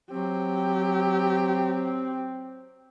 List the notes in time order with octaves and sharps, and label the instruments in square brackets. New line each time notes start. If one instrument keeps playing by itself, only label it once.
[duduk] F#3 [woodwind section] C4 [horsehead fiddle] G4